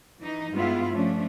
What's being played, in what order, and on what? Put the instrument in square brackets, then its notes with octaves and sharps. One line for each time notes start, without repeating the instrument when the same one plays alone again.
[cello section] E3 D#4
G2 G3 G#3 B3 E4 F4
F3 A3 C#4 D4